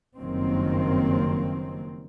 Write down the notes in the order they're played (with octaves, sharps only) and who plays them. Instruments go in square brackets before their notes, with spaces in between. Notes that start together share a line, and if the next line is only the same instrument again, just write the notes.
[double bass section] F#1 G2 D#3 F#3 A#3 C4